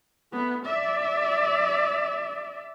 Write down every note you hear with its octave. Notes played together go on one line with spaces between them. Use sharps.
A3 B3
D5 E5